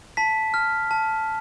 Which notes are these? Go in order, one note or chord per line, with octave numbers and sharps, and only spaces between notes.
A5 B6
F6
A5